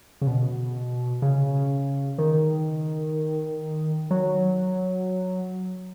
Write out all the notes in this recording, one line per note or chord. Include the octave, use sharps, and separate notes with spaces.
C#3
B2
C#3
D#3
F#3